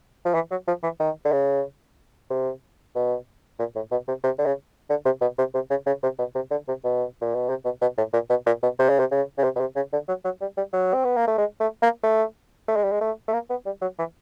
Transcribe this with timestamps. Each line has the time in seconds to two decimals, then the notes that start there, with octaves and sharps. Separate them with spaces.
0.25 F3
0.34 E3
0.51 F#3
0.68 F3
0.83 E3
1.00 D#3
1.25 D3
1.32 C#3
2.30 C3
2.95 B2
3.59 A#2
3.76 A2
3.91 B2
4.08 C3
4.24 C3
4.39 D3
4.46 C#3
4.90 D3
5.05 C3
5.21 B2
5.38 C3
5.54 C3
5.70 C#3
5.87 C#3
6.03 C3
6.19 B2
6.35 C3
6.51 D3
6.68 C3
6.84 B2
7.21 A#2
7.35 B2
7.49 C3
7.65 B2
7.81 B2
7.98 A2
8.13 A#2
8.30 B2
8.46 A#2
8.63 B2
8.79 C3
8.89 C#3
8.99 C3
9.12 C#3
9.38 C#3
9.44 C3
9.56 B2
9.60 C3
9.76 C#3
9.93 D3
10.08 F#3
10.25 F#3
10.41 G3
10.57 G3
10.73 F#3
10.94 C4
11.05 B3
11.16 A#3
11.27 A3
11.38 G#3
11.60 A3
11.82 A#3
12.03 A3
12.69 A3
12.76 G#3
12.84 G3
12.92 G#3
13.01 A3
13.28 A3
13.34 A#3
13.50 B3
13.66 G3
13.82 F#3
13.99 E3